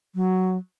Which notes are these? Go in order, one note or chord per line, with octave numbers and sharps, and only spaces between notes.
F#3